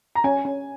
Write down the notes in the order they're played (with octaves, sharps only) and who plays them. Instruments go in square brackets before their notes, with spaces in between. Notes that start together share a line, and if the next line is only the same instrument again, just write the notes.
[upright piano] A#5
[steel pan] C#4 [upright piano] G#5
[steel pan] C#4